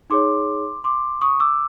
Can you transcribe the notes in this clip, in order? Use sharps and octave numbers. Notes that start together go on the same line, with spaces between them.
D#4 G#4 C#5 C6 D6
C6 D6
C#6 D#6
D6 E6